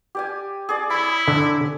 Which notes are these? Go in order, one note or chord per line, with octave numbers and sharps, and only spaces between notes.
G4 D5 G#5
G#4 D5
E4 C#5 B5
D3